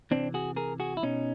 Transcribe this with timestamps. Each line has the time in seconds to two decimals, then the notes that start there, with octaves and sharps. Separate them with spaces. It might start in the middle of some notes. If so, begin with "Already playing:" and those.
0.11 C3 E3 C4 D4
0.34 F#4 G#4
0.56 G#4 A#4
0.80 F#4 G#4
0.97 E4
1.03 B2 C#4 D#4